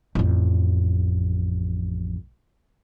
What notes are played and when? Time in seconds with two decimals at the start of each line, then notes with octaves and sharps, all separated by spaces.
0.15 A1 F2